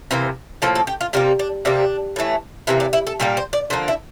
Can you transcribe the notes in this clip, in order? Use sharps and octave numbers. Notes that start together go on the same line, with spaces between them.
C3 E3 A#3 C5
A2 F3 A#3 A4
A4
G4
F4
C3 G3 A#3 F4
D4
C3 G3 A#3 D4
A2 E3 A3
C3 E3 A#3 E4
D4
E4
A4
A#2 G3 A#3 A4
C5
D5
D3 F3 A#3 C5
E4